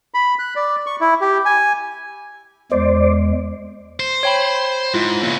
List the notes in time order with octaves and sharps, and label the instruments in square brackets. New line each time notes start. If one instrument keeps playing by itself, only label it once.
[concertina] B5
F#6
D5
C#6
E4
G4
G#5
[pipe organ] E2 G#3 [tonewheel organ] C5 D5
[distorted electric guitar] C5
[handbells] C#5 G5 B5
[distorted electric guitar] G#2 [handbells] E4 F4
[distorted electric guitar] E2 C#3 [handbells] A#3